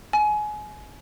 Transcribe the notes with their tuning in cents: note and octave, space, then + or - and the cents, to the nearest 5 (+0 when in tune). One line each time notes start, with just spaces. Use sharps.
G#5 +25